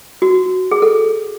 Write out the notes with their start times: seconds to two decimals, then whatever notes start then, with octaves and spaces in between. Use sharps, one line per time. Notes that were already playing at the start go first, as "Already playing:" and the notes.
0.22 F#4
0.71 G#4
0.82 A4